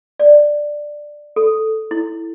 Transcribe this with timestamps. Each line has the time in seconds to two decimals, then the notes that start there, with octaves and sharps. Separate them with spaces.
0.19 D5
1.36 A4
1.91 E4